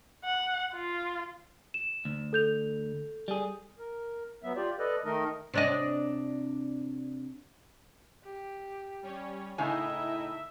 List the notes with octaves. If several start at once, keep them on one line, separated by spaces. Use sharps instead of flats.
F#5
F4
E7
D2
A4 G6 F7
G3 G#4
A#4
F#3 B3 E5
F4 G4 D5
A4 B4 D5 D#5
D#3 A3 D#4 A#4 D#5
C3 D4 D#5
G4
G3 C#4 C#5
A2 C#3 D#4 E4 D#5 E5 G#5